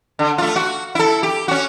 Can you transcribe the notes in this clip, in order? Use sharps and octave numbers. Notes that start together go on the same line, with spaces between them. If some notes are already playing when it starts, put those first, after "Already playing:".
D3
A3 F4
F#4
E4 A4
G4
C#4 F#4